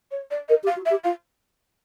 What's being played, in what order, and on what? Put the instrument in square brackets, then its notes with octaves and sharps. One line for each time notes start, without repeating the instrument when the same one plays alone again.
[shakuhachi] C#5
D5
[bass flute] A#4 [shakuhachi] D#5
[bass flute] G4
[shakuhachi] F5
[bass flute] F#4
[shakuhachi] E5
[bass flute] G4
[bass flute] F4 [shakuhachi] F5